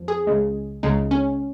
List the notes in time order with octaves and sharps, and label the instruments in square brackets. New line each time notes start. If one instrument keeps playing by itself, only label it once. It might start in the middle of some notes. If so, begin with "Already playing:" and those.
Already playing: [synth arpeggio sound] F2 F3
G#4
C#2 C#3 G#3
C#2 C#3 G#3 D#4
C#4